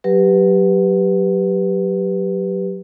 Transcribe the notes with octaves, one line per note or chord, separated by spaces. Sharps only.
F#3 G4 B4